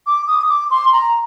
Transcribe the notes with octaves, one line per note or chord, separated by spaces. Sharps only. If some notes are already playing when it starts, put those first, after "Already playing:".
D6
D#6
D6
C6
A#5